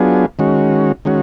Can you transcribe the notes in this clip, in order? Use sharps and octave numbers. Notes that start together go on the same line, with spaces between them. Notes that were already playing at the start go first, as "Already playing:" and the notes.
Already playing: F#3 B3 D4 F4 G#4
D#3 G#3 C#4 F#4
D#3 G#3 C#4 F#4